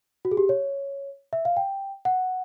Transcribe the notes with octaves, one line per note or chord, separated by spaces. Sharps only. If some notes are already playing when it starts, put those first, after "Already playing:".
F#4
G#4
G4
C#5
E5
F5
G5
F#5